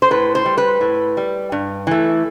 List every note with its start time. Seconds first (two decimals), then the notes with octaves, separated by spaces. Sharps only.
0.02 C5
0.11 A2 B4
0.35 C5
0.46 G3
0.58 B4
0.81 A2
1.17 G3
1.52 G2
1.87 E3 A3